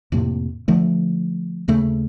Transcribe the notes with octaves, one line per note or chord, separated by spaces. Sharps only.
F2 A2 C3 A#3
D3 F3 A3
D#2 C#3 A3